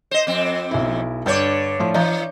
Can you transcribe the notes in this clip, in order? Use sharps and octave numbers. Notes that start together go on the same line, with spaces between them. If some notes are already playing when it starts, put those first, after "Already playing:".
C5 D#5
F2 C4
B1 E4
G2 D3 C#5 D5 G6
A2 F3 F4
E3 D#5 A#5 G6